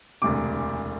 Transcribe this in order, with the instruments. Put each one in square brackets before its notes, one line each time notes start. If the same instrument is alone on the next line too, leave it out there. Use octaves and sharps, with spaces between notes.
[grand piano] E1 D2 C3 D6